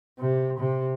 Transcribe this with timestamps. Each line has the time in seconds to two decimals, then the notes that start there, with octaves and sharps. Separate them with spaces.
0.19 C3
0.59 C3